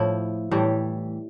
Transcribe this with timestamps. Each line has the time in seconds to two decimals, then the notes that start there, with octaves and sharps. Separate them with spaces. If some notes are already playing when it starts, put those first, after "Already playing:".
Already playing: A2 F3 E4
0.51 A2 E3 G3